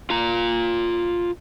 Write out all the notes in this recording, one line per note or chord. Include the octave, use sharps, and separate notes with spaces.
F4 A#5